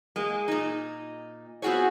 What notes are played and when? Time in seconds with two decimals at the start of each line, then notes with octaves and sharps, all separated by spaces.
0.16 G#3 A#3
0.48 A#2 D#4
1.62 B3 C4 F4 F#4 G#4 C#5